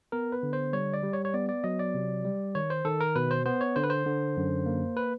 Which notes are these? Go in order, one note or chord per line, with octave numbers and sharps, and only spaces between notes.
B3 A#4
B4
D3
C5
G3 C#5
D5
G3
C#5
C#5
B3 D5
D5
F#3 D#5
D5
C3
G3
D#3 C#5
C5
D#3 A4
A#4
B2 B4
C5
B3 C5
C#5
D3 C5
B4
C5
D3
F#2
A#3
B4